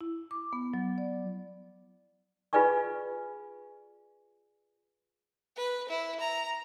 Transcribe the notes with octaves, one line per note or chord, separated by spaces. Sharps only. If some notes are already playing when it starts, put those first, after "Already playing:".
E4
D6
B3
F#3
D5
F4 G#4 B4 D5 G#5 C#6
B4
E4
A#5